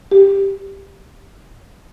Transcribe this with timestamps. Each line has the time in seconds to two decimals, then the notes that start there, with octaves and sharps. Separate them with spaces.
0.11 G4